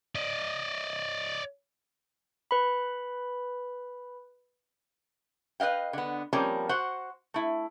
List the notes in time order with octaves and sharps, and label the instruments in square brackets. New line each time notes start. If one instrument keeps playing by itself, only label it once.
[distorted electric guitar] D5 D#5
[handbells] B4 B5
[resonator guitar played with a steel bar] B4 D#5 F5 G5
D3 B3
F3 G3 A#3 C4 C#4
F#4 C5 F#5
A3 E4